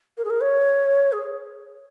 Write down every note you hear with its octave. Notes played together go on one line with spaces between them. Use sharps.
A#4
G#4
A#4
C#5
G#4